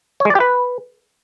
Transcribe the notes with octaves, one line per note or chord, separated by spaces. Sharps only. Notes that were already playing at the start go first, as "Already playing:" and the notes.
C#5
G#3
D5
G4
B4